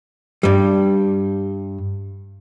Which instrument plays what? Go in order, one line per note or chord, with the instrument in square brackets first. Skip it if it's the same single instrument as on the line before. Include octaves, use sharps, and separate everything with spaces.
[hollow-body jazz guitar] G2 G3